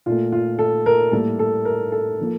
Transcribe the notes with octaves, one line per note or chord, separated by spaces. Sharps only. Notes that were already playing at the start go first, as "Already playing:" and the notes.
A#2 A3 F4
F4
A4
A#4
A2 G3 A#3 A4
A4
A#4
A4
F3 A#3